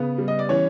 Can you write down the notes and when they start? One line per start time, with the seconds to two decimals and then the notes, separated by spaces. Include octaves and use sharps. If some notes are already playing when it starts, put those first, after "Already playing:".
Already playing: C#3 B3 B4
0.18 G3
0.28 D#5
0.39 D5
0.49 E3 C#4 C#5